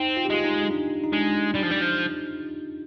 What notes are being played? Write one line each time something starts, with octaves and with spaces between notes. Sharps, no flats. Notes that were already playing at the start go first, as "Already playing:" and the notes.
Already playing: C4 D#4
F4
G4
G#3 F4
D#4
D4
D#4
G#3 D4
G3
F3
G3
F3